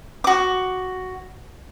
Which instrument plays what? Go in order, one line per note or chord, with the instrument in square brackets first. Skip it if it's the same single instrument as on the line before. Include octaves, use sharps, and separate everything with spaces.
[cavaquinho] F#4 D6